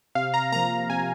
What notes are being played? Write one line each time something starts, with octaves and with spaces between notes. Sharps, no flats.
C3 F5
A#5
F3 A#3 A#5
A#5
C3 G#5